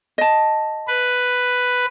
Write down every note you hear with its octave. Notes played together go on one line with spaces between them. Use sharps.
D#5 A5
B4